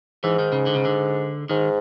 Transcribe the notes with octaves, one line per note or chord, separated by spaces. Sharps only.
G#2 E3
D#3
C#3
D3
C#3
D3
G#2 D#3